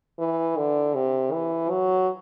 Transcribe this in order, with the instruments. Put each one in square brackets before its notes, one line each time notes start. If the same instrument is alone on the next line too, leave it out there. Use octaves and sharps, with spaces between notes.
[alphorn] E3
D3
C3
E3
F#3